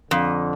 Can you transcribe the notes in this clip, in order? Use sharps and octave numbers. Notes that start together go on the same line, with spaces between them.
F2 D3